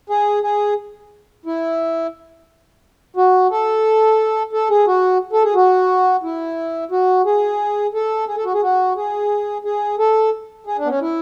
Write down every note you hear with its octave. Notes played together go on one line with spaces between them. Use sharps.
G#4
G#4
E4
F#4
A4
A4
G#4
F#4
A4
G#4
F#4
E4
F#4
G#4
A4
G#4
A4
F#4
G#4
F#4
G#4
G#4
A4
G#4
D4
B3
C#4
E4